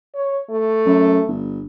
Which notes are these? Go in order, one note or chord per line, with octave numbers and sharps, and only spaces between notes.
C#5
A3
F#2
G1